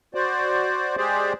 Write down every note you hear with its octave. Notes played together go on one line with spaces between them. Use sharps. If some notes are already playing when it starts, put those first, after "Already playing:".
F#4 C5 D5
G#3 G4 G#4 C5 D5